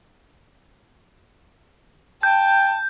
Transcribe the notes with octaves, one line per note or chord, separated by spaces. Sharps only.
G5 A5 G6